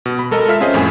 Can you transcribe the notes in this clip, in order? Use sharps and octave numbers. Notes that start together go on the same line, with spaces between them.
B2
B5
G#3 A4 A#4 D#5
F4 E5 F6 B6
C4 C#4 F4 G#4 C5 D#5
F2 A2 G#3 G#5